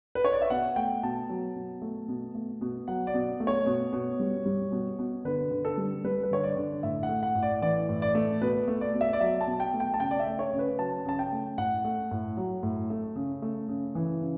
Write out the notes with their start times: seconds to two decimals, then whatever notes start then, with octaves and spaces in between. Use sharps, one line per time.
0.15 B4
0.25 C#5
0.33 D5
0.41 E5
0.50 B2 F#5
0.76 A3 G5
1.03 B2 A5
1.30 F#3
1.56 B2
1.82 A3
2.08 B2
2.35 A3
2.61 B2
2.88 F#3 F#5
3.07 D5
3.14 B2
3.40 A3
3.47 C#5
3.66 B2
3.93 B2
4.20 G3
4.46 G3
4.72 B2
4.99 B2
5.25 D3 B4
5.51 D3
5.65 A4
5.78 G3
6.04 G3 B4
6.24 B4
6.31 D3 C#5
6.43 D5
6.57 D3
6.83 A2 E5
7.03 F#5
7.09 A3
7.23 F#5
7.35 A2
7.43 D5
7.62 E3 D5
7.89 A2
8.02 D5
8.15 A3
8.42 B2 B4
8.68 A3
8.81 D5
8.94 B2
9.01 E5
9.13 D5
9.20 F#3 E5
9.41 A5
9.47 B2
9.60 G5
9.74 A3
9.80 G5
9.94 A5
10.00 C#3 G5
10.11 D5
10.20 E5
10.27 A3
10.39 C#5
10.53 C#3
10.59 B4
10.79 F#3 A5
11.05 C#3 A5
11.19 G5
11.32 A3
11.58 A2 F#5
11.85 A3
12.11 A2
12.37 F#3
12.63 A2
12.90 A3
13.16 C#3
13.42 A3
13.69 C#3
13.95 E3
14.21 C#3